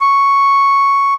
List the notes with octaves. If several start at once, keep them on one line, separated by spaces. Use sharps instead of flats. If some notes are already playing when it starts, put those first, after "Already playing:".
C#6